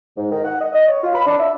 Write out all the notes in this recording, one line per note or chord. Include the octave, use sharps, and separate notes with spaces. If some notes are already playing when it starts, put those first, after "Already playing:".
G#2
D#3
F#5
D#5
D#5
C#5
F4
B5
D4
E5